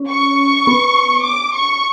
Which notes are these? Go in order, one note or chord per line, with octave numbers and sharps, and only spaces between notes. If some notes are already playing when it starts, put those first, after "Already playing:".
Already playing: C#4
C#6
B3
D6
C#6